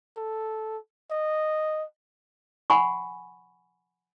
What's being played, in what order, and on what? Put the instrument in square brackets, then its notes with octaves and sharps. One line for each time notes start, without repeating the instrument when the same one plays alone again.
[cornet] A4
D#5
[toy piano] F#5 G#5 B5 C#6